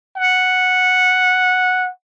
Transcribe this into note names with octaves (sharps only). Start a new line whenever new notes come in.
F#5